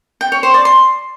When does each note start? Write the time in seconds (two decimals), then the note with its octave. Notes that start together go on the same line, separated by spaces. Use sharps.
0.21 G5
0.32 C#5
0.43 C5
0.54 D5
0.65 C6